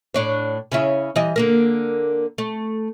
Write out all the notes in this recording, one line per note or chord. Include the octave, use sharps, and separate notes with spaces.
A2 D4 C#5
C#3 C#4 E4
E3 G3 D#5
D3 A#3 A#4
A3